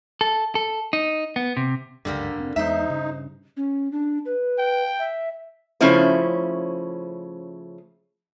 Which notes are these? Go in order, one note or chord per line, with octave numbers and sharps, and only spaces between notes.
A4
A4
D#4
B3
C3
F#1 C#2 G2 D3 G3 A#3
F1 C4
E2 G#3 B3 D#4 C5 E5
G2 C#3
C#4
D4
B4
G5
E5
C#3 F3 A3 C#4 E4 C5